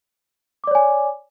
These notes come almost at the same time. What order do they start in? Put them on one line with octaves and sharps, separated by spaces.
D6 D5 C#5 G#5